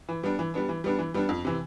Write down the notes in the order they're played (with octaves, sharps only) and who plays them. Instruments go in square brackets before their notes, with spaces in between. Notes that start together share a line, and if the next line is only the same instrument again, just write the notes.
[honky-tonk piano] E3
G3 B3 D4
E3
G3 B3 D4
E3
G3 B3 D4
E3
G3 B3 D4
F2
C3 E3